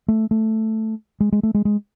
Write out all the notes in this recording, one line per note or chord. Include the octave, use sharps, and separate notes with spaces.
A3
A3
G#3
G#3
A3
G#3
G#3